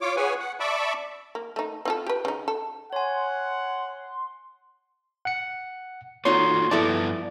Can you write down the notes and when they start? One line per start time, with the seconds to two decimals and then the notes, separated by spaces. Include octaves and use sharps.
0.01 F4 C#5 D6
0.16 G#4 B4 C#5 F#5 G#5
0.40 F#5
0.60 D5 E5 A5 B5 C#6 D6
1.35 A#3
1.56 A3 D#4
1.85 C4 F4 A4
2.07 G4 B4
2.25 C#3 D#4
2.48 A4
2.93 C#5 F#5 G#5 C6
5.25 F#5 C#7
6.25 A#3 D#4 F4 F#4 A4 C#5 C6
6.71 G2 F3 B3 E4 A4 D5 A5